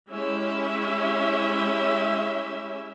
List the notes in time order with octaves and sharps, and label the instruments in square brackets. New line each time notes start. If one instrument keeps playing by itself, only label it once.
[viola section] G#3 C#4 E4 G4 E5